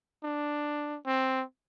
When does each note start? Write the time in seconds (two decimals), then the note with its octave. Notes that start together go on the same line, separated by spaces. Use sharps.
0.23 D4
1.06 C4